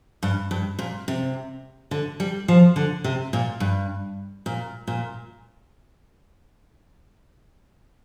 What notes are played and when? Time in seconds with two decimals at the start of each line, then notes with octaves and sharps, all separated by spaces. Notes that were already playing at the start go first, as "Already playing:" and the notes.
0.23 G2
0.51 G2
0.79 A#2
1.08 C3
1.91 D3
2.20 G3
2.48 F3
2.76 D3
3.04 C3
3.33 A#2
3.60 G2
4.46 A#2
4.87 A#2